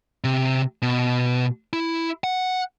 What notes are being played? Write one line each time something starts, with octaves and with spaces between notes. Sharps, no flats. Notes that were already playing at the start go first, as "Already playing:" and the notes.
C3
B2
E4
F#5